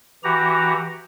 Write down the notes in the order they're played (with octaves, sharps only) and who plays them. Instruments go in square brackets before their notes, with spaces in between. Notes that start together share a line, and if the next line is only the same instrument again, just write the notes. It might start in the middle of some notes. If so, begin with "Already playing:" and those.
[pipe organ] E3 F#4 G4 A#5